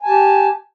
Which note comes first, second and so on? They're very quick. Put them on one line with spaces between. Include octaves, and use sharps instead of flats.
G#5 A5 G4